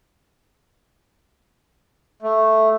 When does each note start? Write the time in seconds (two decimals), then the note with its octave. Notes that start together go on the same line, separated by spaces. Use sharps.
2.22 A3